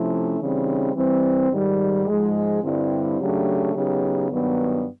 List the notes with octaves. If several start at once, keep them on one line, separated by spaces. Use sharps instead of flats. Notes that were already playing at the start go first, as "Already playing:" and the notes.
Already playing: C3 F3 A3 C#4 E4
C#3 E3 G3 C4 D#4
E3 G3 C4
G#2 D#3 G3
G#2 F3 G#3
G2 D3 G3 C4 E4
C#3 F#3 A3 D4 G4
C#3 F#3 B3 D#4 G4
G2 D#3 F#3 B3